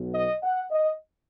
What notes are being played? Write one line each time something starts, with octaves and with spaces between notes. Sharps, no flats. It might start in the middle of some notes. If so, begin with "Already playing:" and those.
Already playing: B1 B2 B3
D#5
F#5
D#5